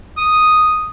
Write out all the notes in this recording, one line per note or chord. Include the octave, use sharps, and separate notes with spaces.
D#6